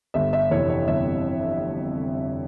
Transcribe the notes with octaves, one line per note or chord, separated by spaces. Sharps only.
G1 E5
E5
F2 C3 E3 C#5
C#5
G1 E5